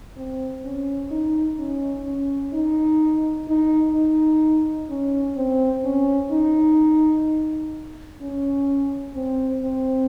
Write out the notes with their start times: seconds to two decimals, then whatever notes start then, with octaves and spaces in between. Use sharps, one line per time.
0.17 C4
0.64 C#4
1.11 D#4
1.59 C#4
2.06 C#4
2.53 D#4
3.48 D#4
3.95 D#4
4.90 C#4
5.37 C4
5.85 C#4
6.32 D#4
8.21 C#4
9.15 C4
9.63 C4